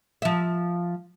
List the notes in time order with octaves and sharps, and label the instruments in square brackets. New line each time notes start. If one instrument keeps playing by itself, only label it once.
[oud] F3 E5